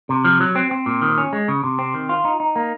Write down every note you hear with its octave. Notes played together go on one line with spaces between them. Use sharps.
C3
F3
F#3
C4
C4
A#2
D#3
C#4
G#3
C#3
C3
C4
D#3
F4
D#4
D#4
A#3